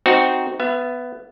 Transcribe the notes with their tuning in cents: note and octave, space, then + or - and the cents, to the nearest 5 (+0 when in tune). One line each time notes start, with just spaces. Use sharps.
C4 -5 D#4 +0 F#4 +0
B3 +10 E5 +40